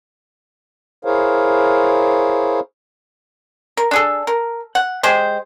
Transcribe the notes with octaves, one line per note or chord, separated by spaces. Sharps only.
E4 G#4 A#4 C5 C#5 F5
A#4
D4 G#4 A4
A#4
F#5
G#3 G4 G#4 C5